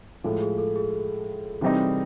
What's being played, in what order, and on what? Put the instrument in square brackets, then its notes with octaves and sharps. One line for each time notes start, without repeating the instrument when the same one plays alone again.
[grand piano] A2 F3 G#3 [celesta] A4
[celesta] G#4
A4
G#4
[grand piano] C3 E3 G3 C4 D#4